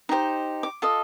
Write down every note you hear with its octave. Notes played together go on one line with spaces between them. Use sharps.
D#4 G4 C5
D6
F4 A4 D#5